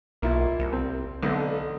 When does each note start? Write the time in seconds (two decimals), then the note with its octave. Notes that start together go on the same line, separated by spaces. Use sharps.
0.22 B1 A#3 E4 F4
0.60 C2
0.73 C4
1.23 B1 D3